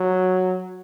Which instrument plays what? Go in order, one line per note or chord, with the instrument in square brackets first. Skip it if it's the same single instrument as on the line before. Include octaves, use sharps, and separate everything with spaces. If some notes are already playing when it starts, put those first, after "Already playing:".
Already playing: [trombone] F#3